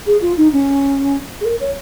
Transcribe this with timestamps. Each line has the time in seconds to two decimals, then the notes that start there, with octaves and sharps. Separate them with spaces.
0.07 G#4
0.22 F4
0.37 D#4
0.53 C#4
1.41 G#4
1.45 A#4
1.60 C#5